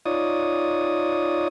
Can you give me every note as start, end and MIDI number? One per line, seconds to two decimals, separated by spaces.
0.06 1.48 63
0.06 1.48 65
0.06 1.48 73
0.06 1.48 74
0.06 1.48 87